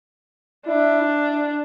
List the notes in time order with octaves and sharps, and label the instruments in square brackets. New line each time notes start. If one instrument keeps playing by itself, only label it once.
[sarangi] D4 [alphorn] E4
[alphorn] E4